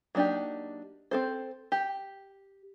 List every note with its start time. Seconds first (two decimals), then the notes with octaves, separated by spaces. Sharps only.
0.15 F#3 A#3 D4 D#4 G4
1.11 C4 A4 C5
1.72 G4